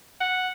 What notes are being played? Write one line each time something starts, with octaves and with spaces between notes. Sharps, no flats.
F#5